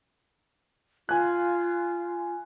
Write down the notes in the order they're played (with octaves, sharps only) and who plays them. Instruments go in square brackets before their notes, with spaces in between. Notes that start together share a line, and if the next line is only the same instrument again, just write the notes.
[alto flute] F4 [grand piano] G#5 F#6